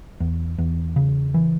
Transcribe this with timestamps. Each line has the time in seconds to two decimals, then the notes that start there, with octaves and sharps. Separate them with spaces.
0.20 E2
0.58 E2
0.96 C#3
1.34 E3